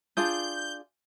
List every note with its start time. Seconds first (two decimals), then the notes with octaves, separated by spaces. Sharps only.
0.17 D4 F4 G#4 G6